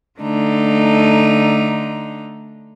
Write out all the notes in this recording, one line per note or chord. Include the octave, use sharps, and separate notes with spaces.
D3 A3 D4 D#4 A#5